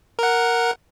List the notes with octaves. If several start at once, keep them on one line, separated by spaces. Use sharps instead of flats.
A#4 F#5